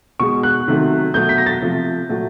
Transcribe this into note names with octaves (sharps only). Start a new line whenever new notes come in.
B2 G#3 C#6
F#6
C3 D#3 F#3 A3
B2 F#3 A3 G6
B6
A#6
A6
C3 F3 A3
A#2 F#3 A3